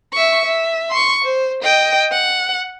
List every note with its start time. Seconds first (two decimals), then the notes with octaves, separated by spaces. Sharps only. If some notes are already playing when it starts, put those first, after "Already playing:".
0.13 E5 C#6
0.45 E5
0.90 C6 C#6
1.24 C5
1.63 D#5 G5
2.12 F#5